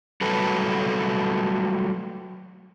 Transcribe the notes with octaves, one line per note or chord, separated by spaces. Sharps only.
F#3 G3 A3 A4 B4